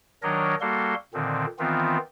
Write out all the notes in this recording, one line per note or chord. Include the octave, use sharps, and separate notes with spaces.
D#3 F#3 D4 A#4 C#5 D#5
G3 A#3 F#4 A4 C6
A#2 D3 D#3 C4
D#3 E3 B3 C4 F4